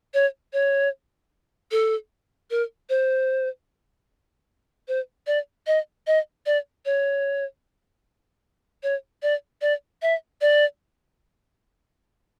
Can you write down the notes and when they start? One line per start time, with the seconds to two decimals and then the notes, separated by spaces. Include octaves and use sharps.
0.14 C#5
0.53 C#5
1.71 A4
2.51 A#4
2.89 C5
4.88 C5
5.27 D5
5.67 D#5
6.07 D#5
6.46 D5
6.85 C#5
8.83 C#5
9.22 D5
9.61 D5
10.02 E5
10.41 D5